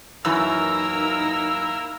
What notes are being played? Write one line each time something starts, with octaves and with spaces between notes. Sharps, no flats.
F#2 E3 A#3 D#4 E4 A#4 A#5 E6